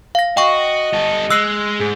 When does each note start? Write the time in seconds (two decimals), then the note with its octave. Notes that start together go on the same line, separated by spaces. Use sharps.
0.15 F5 A#6
0.37 F#4 D#5 G5 C#6
0.93 G3 A4
1.30 G#3 E6 F#6 C7
1.80 G#2 G#4